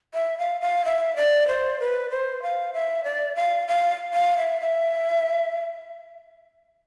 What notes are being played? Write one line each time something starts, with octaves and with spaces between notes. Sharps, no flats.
E5
F5
F5
E5
D5
C5
B4
C5
F5
E5
D5
F5
F5
F5
E5
E5